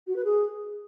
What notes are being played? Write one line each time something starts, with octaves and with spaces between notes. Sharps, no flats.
F#4
B4
G#4